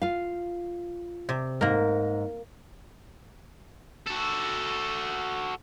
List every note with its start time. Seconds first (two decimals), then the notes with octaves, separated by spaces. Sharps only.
0.02 F4 F5
1.29 C3
1.61 G#2 A#3 A#4
4.07 F#4 A4